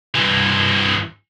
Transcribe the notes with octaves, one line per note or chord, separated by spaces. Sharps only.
G2 E3